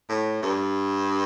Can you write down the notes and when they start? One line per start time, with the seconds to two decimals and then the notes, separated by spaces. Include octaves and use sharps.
0.09 A2
0.43 G2